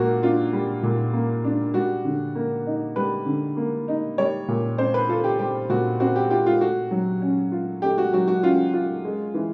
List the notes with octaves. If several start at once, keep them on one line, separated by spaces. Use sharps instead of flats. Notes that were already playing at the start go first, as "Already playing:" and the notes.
Already playing: A#2 A#3 F#4
D4 F4
G3
A#2
A#3
D4
G3 F#4
D3
A#3
D#4
G3 B4
D3
A#3
D#4
G3 C#5
A#2
C4 C5
B4
F4 A4
G4
G3 G4
A#2 F#4
C4 F#4
G4
F4 G4
F4
A3 F#4
F#3
C#4
F4
A3 G4
F#4
F#3 F#4
F#4
C#4 F4
F4
G#3
E3